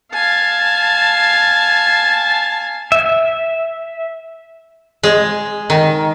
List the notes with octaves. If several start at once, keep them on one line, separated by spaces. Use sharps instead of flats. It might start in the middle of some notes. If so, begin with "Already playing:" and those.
F5 G#5 A5
E5
G#3
D#3